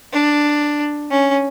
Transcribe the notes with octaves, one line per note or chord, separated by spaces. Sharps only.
D4
C#4